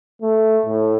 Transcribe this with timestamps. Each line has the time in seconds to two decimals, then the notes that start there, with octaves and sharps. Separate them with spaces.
0.22 A3
0.66 A2